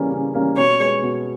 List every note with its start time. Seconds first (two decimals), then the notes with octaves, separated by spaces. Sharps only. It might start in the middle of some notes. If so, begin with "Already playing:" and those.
Already playing: C#3 E3 G3 A#3 C#4
0.11 C#3
0.34 E3 G3 A#3 C#4
0.57 B2 C#5
0.80 G#3 B3
1.03 B2